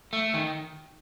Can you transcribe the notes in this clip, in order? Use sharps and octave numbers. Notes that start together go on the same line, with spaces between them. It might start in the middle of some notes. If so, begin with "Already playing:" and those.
A3
D#3